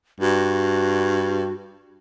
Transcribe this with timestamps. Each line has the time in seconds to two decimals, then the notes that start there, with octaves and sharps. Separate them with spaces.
0.21 G2 F#4